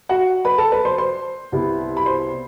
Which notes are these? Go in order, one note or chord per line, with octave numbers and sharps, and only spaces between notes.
F#4 F#5
B4 B5
A4 A5
B4 B5
C5 C6
C5 C6
C2 C3 G3 B3 E4
B5
C5 C6